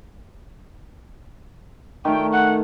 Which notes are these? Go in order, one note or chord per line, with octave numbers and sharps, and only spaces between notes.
D#3 A3 G5
F#5